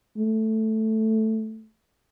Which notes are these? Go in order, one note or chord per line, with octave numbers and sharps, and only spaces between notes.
A3